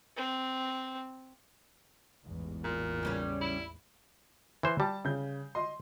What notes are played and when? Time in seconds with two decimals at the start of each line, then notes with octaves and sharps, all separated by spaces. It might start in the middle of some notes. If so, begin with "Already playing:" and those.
0.17 C4
2.25 A1 E2 G#2
2.64 A#2
3.03 C#3 G3 C#4
3.41 E4
4.63 E3 C5
4.80 G3 A5
5.05 C#3 G6
5.55 D#5 C6